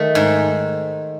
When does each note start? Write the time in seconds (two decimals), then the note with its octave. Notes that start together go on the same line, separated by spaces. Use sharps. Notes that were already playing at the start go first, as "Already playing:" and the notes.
Already playing: D#3 A3
0.15 G#2